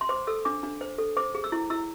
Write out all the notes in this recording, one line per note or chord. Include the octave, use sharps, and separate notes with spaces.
C6
C5 D6
A4 E6
D4 D6
D4
C5
A4
C5 D6
G#4
E6
E4
E4 E6